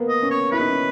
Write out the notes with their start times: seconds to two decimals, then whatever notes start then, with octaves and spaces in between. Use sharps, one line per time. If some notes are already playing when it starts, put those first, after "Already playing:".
Already playing: A#3 B3
0.09 D#5
0.23 C#4
0.30 C#5
0.51 E4 B4
0.60 D#4
0.70 C#4